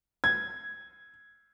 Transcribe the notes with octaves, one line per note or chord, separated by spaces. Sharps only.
G#6